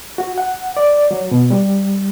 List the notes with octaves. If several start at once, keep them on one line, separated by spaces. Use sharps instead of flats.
F#4
F#5
D5
F#3
B2
G3